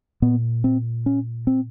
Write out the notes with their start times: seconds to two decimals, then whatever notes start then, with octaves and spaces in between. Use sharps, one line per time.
0.22 A#2 B3
0.64 C4
1.06 C#4
1.47 C4